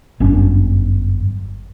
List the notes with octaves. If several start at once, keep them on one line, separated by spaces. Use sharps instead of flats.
G1 F#2 C#4 D4